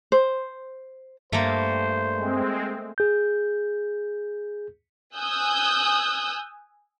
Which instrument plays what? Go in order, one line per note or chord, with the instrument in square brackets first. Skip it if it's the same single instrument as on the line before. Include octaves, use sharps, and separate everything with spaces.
[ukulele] C5
[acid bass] G2 [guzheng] A3 A#3 [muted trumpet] C5
[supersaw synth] G#3 C4
[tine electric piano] G#4 G6
[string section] G#5 D#6 E6 F#6 G6